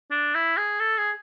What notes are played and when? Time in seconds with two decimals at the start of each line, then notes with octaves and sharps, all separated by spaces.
0.11 D4
0.35 E4
0.57 G#4
0.80 A4
0.98 G#4